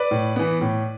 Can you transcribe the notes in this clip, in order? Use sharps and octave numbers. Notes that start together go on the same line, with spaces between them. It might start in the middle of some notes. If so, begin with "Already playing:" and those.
Already playing: B4 D5
A2
E3 B3
A2